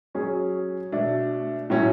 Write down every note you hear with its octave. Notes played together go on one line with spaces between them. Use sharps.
F#3 C#4 G#4
B2 A3 D4
A2 F#3 C#4 F#4